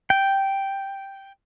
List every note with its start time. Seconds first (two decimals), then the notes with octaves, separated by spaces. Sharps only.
0.10 G5